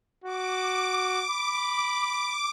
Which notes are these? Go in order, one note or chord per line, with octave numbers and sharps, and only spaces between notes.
F#4 D6
B5